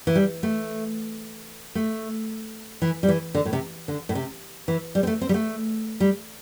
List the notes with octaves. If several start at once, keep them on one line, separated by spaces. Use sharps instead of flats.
E3
G3
A3
A3
E3
G3
E3
D3
A2
C3
D3
A2
C3
E3
G3
C4
A3
C4
G3
A3
G3